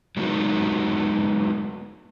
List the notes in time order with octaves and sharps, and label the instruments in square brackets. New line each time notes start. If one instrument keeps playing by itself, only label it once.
[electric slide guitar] F#3 G#3 A3 B3 D#4 F#4